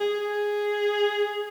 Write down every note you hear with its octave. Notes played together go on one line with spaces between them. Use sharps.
G#4